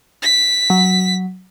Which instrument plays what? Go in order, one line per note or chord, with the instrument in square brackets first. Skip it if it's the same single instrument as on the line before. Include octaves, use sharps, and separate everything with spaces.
[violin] B6
[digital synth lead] F#3